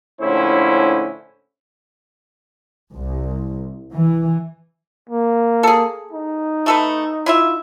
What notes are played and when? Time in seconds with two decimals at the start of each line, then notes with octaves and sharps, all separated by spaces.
0.21 A#1 A2 D3 C#4 E4 C5
2.92 C2
3.91 E3
5.09 A#3
5.63 G#4 A4
6.13 D#4
6.66 A3 A4 B4
7.26 E4 F4 E5